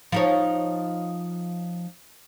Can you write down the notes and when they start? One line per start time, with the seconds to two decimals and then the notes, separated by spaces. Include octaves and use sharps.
0.12 F3 D#4 C#5